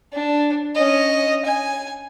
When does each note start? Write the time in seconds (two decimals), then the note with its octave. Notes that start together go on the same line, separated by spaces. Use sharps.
0.13 D4
0.75 C#4 D#5
1.45 G#5